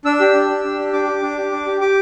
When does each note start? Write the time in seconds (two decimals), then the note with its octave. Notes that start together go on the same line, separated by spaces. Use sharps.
0.05 D4 E6
0.20 G4
0.35 D4
0.50 G4
0.65 D4
0.78 G4
0.93 D4 D6
1.07 G4
1.22 D4
1.37 G4
1.51 D4
1.66 G4
1.81 G4 D6